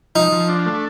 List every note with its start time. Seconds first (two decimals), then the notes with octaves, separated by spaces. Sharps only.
0.15 F3 D#4
0.32 F3
0.49 D4
0.66 A3